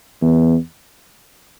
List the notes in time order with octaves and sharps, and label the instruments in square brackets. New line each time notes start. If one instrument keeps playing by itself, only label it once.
[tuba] E2